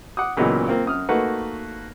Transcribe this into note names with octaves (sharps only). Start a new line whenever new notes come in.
F#5 D6 D#6
C#2 A#2 E3 F#3 G#3 B3
A#3 C4 F4
F#2 D#6 F6
A3 A#3 D#4 F#4 B4 F#5